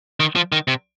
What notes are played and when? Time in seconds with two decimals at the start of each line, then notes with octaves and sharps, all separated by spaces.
0.20 D#3
0.36 F3
0.52 D#3
0.68 C3